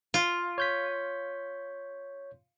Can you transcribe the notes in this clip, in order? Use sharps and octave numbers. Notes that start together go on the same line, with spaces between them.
F4
C#5 G6 B6